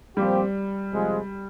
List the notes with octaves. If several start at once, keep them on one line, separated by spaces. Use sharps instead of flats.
A#2 F3 G3 C4 G4
C3 F3 G#3